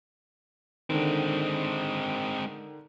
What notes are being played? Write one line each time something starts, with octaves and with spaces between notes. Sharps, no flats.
D3 D#3 G#3 C4